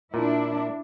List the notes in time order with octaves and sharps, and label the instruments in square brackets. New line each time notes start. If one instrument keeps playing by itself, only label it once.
[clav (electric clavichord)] A#2 [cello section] D4 E4